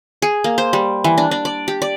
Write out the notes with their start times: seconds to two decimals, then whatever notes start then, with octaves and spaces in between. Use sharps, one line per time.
0.22 G#4
0.44 A#3
0.58 C5
0.73 G3
1.04 E3
1.18 D4
1.31 D4
1.45 D5
1.68 G4
1.82 D5